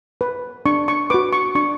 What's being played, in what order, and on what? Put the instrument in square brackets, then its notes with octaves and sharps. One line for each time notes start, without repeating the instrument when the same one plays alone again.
[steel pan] B4
D4 C#6
C#6
F#4 B4 D6
C#6
D4 C#6